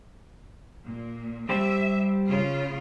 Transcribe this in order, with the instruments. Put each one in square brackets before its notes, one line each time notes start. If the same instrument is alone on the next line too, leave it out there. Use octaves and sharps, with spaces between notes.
[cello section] A#2
[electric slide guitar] G3 G4 C5 [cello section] E5
[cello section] C#3 F4